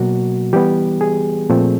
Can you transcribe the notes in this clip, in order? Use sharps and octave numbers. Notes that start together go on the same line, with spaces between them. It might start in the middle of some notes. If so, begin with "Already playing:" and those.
Already playing: B2 F#3 A#3 F#4
E3 G3 B3 G4
G#4
A#2 F3 A3 C4